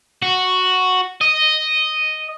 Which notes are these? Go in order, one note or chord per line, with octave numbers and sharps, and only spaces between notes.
F#4
D#5